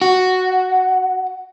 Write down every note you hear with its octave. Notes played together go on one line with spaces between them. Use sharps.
F#4